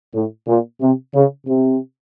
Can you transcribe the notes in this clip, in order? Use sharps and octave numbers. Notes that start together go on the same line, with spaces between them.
A2
A#2
C3
C#3
C3